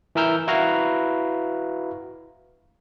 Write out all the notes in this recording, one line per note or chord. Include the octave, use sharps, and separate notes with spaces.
E3 E4 A#4 E6 F6 G6
E4 F#4 B4 F5 A#5